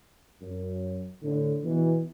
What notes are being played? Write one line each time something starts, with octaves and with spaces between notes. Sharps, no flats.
F#2
A2 D3
B2 E3